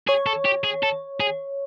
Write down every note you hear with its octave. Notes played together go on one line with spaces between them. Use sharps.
G#4 C#5
A4
G4
G#4
A4
G#4